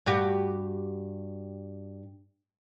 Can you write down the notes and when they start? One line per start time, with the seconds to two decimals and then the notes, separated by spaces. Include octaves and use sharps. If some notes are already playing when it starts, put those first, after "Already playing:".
0.06 G2 F#4 G4